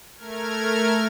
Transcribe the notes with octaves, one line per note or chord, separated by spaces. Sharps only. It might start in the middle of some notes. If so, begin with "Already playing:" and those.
A3 A#4 F6 G#6